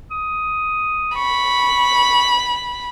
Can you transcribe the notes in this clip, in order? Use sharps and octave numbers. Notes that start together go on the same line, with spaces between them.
D#6
B5 C#6